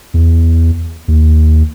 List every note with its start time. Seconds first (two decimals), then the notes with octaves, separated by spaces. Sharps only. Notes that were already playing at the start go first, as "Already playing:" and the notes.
0.14 E2
1.08 D#2